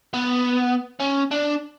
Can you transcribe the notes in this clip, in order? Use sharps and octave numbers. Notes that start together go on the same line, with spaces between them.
B3
C#4
D4